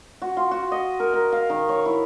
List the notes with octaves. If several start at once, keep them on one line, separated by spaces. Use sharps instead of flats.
F#4
F4
F#4
D#5
A#4
A#4
F5
D#3
C#5
E4